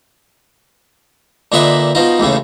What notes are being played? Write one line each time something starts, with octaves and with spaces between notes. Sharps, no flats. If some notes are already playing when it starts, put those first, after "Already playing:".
A#2 D3 D#4 B4 E5
B2 F3 D#4
A1 D#2 A2 C#3